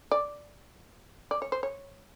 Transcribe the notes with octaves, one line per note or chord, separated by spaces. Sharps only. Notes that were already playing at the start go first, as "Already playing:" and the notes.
D5
D5
C#5
C5
C#5